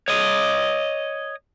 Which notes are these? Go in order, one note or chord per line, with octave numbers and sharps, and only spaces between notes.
C#5 D#5